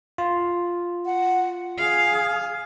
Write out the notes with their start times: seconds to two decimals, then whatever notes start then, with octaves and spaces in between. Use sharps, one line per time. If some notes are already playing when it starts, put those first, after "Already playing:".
0.18 F4
1.05 F#5
1.78 G#4 F5